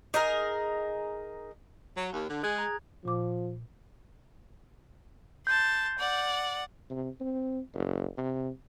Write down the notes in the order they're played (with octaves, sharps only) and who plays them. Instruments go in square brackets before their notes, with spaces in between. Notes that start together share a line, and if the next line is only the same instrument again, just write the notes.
[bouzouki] D#4 G#4 A#4
[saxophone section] F#3
D#2
D3
[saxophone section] G#3 [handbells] G#4 F#6 G#6
[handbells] A#5
[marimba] A#2 D6 [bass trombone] F3
[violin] A5 C6 [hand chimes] G6
[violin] D5 F#5
[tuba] C3
C4
F#1
C3